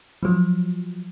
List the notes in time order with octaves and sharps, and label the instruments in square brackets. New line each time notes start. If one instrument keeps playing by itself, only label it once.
[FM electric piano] F3 F#3